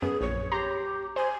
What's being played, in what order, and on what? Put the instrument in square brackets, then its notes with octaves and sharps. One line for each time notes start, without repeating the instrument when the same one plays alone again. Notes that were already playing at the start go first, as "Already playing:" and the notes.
[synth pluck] F#2 B3 [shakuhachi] G#4
[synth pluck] A#1 [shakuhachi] C#5
[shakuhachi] G4 [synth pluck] A#5 C6
[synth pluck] C5 [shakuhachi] G#5